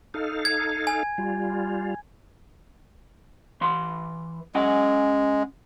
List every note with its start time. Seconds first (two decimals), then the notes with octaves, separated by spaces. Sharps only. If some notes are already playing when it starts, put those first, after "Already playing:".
0.14 D#4 A4 F5
0.45 G#6
0.87 G#5
1.18 G3 F4
3.61 E3 C6
4.55 G#3 C#4 F#5 G#5